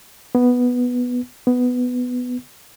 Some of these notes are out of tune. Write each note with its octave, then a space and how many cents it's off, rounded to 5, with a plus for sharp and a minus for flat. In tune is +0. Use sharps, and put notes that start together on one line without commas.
B3 +0
B3 +10